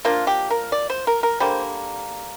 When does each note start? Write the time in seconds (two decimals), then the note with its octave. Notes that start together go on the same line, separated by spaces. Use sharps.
0.05 F3 A#3 D4 F4
0.27 G4
0.51 A#4
0.72 D5
0.90 C5
1.07 A#4
1.23 A#4
1.40 D3 G3 A#3 C5